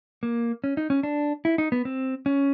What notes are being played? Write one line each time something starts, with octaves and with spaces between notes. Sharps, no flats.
A#3
C#4
D#4
C#4
D4
E4
D#4
B3
C4
C#4